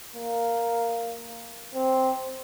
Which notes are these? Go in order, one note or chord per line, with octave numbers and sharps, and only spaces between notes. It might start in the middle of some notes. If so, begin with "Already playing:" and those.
A#3
C4